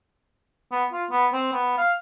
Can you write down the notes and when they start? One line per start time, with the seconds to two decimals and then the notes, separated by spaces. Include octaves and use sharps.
0.71 B3
0.93 F4
1.11 B3
1.33 C4
1.53 B3
1.78 F5